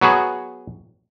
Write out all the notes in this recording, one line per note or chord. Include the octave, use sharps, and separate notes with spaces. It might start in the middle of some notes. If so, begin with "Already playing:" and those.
F#3 B3 F#4 G#4